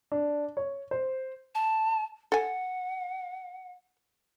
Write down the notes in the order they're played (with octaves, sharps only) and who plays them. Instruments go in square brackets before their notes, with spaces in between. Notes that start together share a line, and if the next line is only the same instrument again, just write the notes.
[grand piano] D4
C#5
C5
[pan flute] A5
[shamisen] A4 G#5 [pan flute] F#5